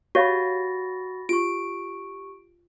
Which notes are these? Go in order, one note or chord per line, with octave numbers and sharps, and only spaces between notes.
F#4 G4 C#5 F5 B5 A6 A#6
F4 G4 C#6 D7